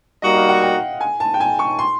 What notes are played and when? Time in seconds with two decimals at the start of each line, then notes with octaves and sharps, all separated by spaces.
0.22 G3 A#3 D#4 F#4 D#5
0.35 F5
0.49 F#5
0.62 G5
1.01 G#5
1.20 A5
1.34 G5
1.40 G#5
1.59 C#6
1.79 C6